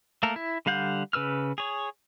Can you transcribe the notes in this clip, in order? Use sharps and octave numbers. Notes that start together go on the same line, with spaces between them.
A3 A#3 A4 A#4
E4
D3 G3 F5 F#5 G6
C#3 B4 E6 F6
G#4 C#5